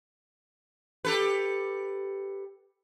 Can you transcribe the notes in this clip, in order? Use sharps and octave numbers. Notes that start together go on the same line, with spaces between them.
G4 A4 B4